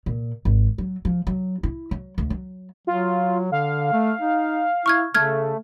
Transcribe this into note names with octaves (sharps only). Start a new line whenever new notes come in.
A#2
G#1
F#3
F3
F#3
E4
F#3
D2
F#3
F#3 F4
D3 F5
A3
D#4
E4 C#6 F6 G#6
C#3 A3 F6 G#6